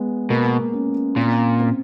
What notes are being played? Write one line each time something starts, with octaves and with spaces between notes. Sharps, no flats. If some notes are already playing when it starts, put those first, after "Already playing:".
Already playing: G#3 B3
B2 A#3
C#4
A#2 C4
C4